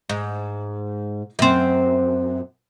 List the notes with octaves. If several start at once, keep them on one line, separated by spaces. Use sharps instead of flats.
G#2
F#2 C4